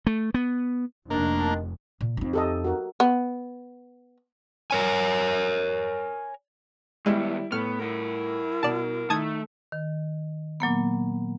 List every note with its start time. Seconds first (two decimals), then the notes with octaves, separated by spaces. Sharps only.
0.07 A3
0.34 B3
1.10 F1 D#3 A#3 D4
2.01 A#2
2.17 F2 D#4
2.33 G4 A4 D#5
2.64 F#4 A#4
3.00 B3
4.71 A#4 C#5 G#5
7.06 D#3 G3 G#3 B3 E4
7.52 A2 B3 F6
7.80 E4 A#4 F#5
8.63 B2 D5 A5
9.10 D#3 A3 A4 A5 D#6 G#6
9.72 D#3
10.60 A#2 F#3 A#3 B3